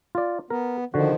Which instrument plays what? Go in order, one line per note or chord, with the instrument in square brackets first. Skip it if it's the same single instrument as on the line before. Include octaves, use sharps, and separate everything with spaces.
[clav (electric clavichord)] F4 D5
[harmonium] B3 [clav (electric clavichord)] A#4
[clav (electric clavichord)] D3 F#4 [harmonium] D#3 F3